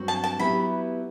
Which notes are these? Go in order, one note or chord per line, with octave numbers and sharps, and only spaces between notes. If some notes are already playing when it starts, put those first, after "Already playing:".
Already playing: G2 F#3 C4 F#4 C5
A5
A5
F#3 B3 E4 G4 B4 B5